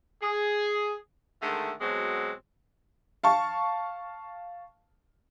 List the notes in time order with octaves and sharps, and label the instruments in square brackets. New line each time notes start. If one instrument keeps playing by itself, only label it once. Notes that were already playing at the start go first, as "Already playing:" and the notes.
[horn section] G#4
D3 D#3 G#3 A3
B2 F#3 G#3 C4 F#4
[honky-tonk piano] F5 A5 C#6